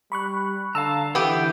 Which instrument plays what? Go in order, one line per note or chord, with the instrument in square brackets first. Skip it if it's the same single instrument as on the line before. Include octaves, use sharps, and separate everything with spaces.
[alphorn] G3 [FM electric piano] B5 C#6 F#6
[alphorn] D3 [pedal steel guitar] F5 A5 A#5 [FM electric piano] E6
[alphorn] D3 [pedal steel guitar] E3 [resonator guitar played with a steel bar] B3 G4